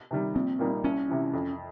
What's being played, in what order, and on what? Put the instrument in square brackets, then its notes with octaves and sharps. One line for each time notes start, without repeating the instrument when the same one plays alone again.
[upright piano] C3 D#3 G3
[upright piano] A#1 [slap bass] C4
[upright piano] A#2 G3 A#3 D#4
[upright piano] C2 [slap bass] C#4
[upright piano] C3 E3
F2